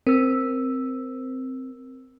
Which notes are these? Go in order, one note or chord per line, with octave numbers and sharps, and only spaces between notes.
C4 A#4 E6